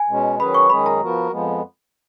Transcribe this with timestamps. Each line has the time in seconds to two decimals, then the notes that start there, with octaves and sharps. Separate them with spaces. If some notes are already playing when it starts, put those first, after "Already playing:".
Already playing: G#5
0.08 B2 G#3 C#4
0.39 D#3 F#3 C#4 G#4 B4 B5
0.54 C#6
0.70 F#2 D#3 G#3 C#4 G#4 B5
0.86 A#5
1.01 F3 B3 F#4 A#4
1.32 F2 F3 G#3 B3